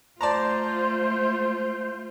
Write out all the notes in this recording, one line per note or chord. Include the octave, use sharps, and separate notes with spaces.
A3 F4 C5 D5 A5 A#5